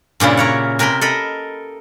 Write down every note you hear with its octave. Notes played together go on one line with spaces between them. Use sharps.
G2 A#2 C#3 E4
A#4 C#5 F#5
C3 A#4 G#5 B5 C6
A4 A#4 D#5 B5